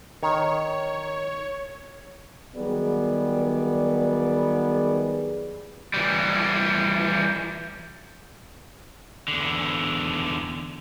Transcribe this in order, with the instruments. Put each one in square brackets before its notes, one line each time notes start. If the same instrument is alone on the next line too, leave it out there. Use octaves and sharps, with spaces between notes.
[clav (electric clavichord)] D#3 [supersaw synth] C#5
[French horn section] D#3 F#3 G3 B3 G#4 D5
[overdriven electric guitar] E3 G3
E2 D3